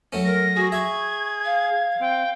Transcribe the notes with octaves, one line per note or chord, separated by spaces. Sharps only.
F#3 A3 C#4
A#4 A#6
F#4 G#4
E5 C#6 G#6
F5
C4 G5